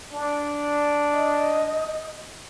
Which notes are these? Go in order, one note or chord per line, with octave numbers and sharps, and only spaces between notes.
D4
D#5